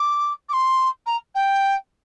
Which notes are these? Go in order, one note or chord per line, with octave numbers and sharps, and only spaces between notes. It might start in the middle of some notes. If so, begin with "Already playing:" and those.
Already playing: D6
D6
C6
A#5
G5